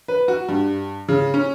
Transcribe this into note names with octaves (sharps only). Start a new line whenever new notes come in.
B4
F#4
G2
C#3
C#4